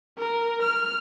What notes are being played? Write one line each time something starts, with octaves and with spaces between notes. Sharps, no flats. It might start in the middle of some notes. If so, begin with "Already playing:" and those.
A#4
F6